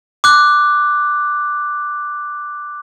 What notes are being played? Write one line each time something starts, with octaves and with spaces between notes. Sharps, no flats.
D6 F#6